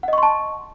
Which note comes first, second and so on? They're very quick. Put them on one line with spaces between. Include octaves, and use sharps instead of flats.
F#5 D#5 C#6 C6 A5